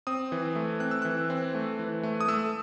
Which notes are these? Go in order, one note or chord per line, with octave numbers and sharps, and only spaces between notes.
C4 D#6
E3
A3
C4 F#6
E6
E3 F#6
C4
A3
E3
A3
D#6
A3 E6